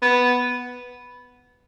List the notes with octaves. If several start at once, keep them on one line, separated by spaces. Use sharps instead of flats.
B3